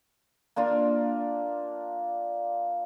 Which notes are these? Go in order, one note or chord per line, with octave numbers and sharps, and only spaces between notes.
A#3 D4 F4